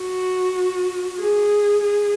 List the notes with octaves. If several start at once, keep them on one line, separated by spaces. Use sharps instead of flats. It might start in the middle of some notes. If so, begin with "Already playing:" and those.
Already playing: F#4
G#4
G#4